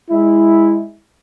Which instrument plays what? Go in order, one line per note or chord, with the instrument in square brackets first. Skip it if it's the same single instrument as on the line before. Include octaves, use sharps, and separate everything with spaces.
[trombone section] G#3 E4